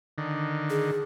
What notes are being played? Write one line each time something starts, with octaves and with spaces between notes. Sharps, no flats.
D3 D#3
G#4